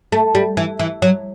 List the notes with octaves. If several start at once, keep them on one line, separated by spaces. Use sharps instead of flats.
A3
G3
E3
E3
F#3